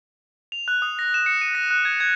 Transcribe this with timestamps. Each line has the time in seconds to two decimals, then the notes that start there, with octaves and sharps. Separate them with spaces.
0.52 F7
0.68 F#6
0.82 D#6
0.99 A#6
1.14 E7
1.26 C#7
1.41 D#7
1.55 A#6
1.71 F#6
1.85 G#6
2.00 G#6